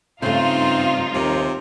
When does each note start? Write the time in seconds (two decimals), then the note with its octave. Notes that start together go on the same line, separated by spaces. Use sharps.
0.22 G2 C#3 A3 C4 D#4 F4
1.14 D#2 C3